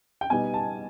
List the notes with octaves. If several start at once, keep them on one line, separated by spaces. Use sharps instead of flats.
G5
B2 G3 B3 D#4 G#5
A5